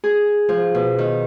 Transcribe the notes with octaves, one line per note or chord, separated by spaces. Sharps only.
G#4
F3
B2
D#3